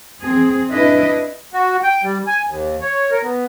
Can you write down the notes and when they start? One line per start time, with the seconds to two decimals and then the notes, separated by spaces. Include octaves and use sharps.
0.22 C4 G#4
0.69 D4 E4 B4 D#5
1.54 F#4
1.83 G5
2.03 G3
2.27 G#5
2.47 D#2
2.81 C#5
3.11 A#4
3.23 B3